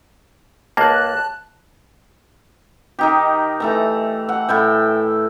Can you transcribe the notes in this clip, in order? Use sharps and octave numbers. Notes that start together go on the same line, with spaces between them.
C#2 A#3 A5 F#6
D#3 D#4 G4
E3 A3 A#5
F#5
A2 E4 G5